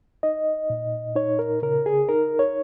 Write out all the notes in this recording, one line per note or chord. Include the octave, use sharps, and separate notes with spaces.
D#4 D#5
A#2
D#4 C#5
A#4
C#3 A#4
G#4
D#4 A#4
C#5